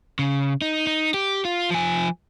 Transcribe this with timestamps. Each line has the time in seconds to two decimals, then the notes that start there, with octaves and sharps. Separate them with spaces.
0.19 C#3
0.62 D#4
0.87 D#4
1.14 G4
1.45 F4
1.70 F3 G#5